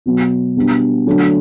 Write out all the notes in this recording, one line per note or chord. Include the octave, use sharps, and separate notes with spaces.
B2 F#3 B3
B2 G3 B3 D4
D3 F#3 A3 D4